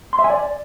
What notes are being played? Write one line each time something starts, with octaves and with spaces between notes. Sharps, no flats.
C6
E5
G#5
D5